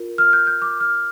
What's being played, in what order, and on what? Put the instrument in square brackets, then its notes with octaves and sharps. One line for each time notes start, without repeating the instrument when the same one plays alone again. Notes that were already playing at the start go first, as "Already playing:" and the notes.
Already playing: [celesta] F4 A#4
F6
G6
G6
D6
F6